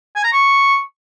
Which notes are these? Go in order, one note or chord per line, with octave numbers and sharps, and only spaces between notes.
G#5
A#5
C#6